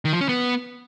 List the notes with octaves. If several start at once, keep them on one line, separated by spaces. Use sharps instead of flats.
D#3
F3
C#4
B3